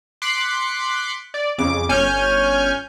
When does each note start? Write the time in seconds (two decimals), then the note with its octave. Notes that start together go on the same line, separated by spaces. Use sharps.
0.22 C6 D6 F#6 B6 C#7
1.34 D5
1.58 F2 C#3 D6
1.89 G1 C#4 G#5 F6 G6